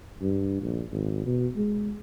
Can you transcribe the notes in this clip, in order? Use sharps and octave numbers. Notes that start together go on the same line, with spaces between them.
G2
A#1
G#1
B2
G#3